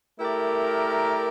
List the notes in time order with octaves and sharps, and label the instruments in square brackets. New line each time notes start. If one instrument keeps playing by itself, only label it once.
[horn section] A3 E4 G4 A#4 D5